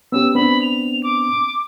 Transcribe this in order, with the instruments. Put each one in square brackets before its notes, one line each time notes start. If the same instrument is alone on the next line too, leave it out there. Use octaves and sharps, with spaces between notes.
[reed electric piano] B3 C#4 G4 [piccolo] E6
[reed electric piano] B3 C4 D4 [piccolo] B5
[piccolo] F7
D6